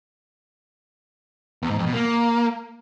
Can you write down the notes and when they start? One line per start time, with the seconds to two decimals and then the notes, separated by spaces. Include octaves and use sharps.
1.63 E2
1.70 G#2
1.78 F2
1.86 B2
1.94 A#3